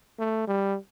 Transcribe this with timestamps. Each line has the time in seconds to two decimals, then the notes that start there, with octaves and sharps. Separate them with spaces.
0.19 A3
0.47 G3